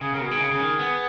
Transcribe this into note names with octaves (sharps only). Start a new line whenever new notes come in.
C#3 G#4
C#3 A#4
B2
D#3 G#4
C#3
C#3
D#3
B3